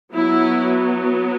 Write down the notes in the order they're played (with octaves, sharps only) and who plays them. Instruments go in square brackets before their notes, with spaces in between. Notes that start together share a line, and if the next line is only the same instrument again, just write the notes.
[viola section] F#3 B3 E4